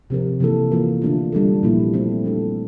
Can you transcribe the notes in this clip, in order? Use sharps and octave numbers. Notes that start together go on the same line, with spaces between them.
C3 F3 C4 G4 A#4
C3 E3 A#3 E4 A4
E3 A#3 F4 A#4
D3 A3 D4 F4
G3 D4 A4
A#2 F3 A#3 E4 G4
A3 C4 E4
G3 D4 A4